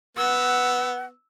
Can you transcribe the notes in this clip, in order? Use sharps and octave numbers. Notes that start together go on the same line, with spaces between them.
B3 F#5 E6